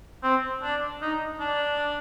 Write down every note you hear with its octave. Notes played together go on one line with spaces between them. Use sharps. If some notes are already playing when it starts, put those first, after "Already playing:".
C4
D4
D#4
D4